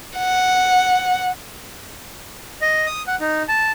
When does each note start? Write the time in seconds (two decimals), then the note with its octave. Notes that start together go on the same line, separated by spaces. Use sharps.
0.17 F#5
2.62 D#5
2.86 D#6
3.07 F#5
3.20 D#4
3.49 A5